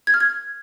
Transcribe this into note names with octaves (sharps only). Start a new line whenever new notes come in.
G#6
F6
G#6